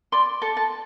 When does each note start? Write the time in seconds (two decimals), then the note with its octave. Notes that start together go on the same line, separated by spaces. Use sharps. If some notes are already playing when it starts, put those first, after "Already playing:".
0.12 D5 C6
0.42 A4 A5
0.57 A5